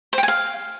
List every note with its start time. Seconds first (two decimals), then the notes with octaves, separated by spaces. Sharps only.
0.13 C5
0.18 G5
0.23 G#5
0.28 F5